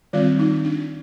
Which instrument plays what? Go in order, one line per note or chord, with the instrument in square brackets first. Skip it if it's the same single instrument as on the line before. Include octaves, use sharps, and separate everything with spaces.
[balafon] D#3 G3 C4 F4
D#4
D4